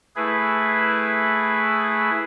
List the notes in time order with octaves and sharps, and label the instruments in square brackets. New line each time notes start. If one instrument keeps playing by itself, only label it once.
[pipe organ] A3 E4 G#4 B4